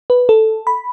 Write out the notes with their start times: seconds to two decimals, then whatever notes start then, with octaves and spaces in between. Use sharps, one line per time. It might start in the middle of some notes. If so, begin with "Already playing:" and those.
0.10 B4
0.29 A4
0.67 B5